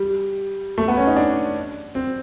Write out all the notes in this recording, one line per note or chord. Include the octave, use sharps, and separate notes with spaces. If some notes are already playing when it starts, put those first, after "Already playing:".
Already playing: G3
A3
B3
C#4
D#4
D4
C4